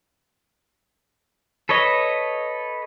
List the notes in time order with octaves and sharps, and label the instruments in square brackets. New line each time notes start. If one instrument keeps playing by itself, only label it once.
[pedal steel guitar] A4 B4 C#5 D#5